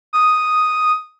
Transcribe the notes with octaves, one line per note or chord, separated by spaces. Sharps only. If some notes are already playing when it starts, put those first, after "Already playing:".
D#6